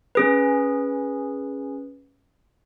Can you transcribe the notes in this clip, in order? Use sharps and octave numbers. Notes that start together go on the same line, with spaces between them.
C#4 G#4 B4